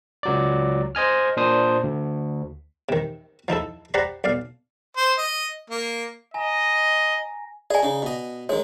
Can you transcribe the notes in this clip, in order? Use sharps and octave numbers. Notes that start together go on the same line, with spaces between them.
C#2 F#3 D5
C5 D#5 G#5 F6
A#2 D4 C5 D#6
D2
C3 D#3
F3 D#4 E4 A4
G4 C5 D5 F#5 A#5 B5
B1 D5 F5
C5
D#5
A#3
D#5 G#5 A#5 A#6
G#4 D5 D#5 G#5
C#3 D#4
B2 D#5
D#3 G#3 C#5